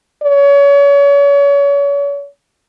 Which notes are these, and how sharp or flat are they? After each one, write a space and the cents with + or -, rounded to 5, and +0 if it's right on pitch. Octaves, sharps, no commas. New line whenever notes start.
C#5 +35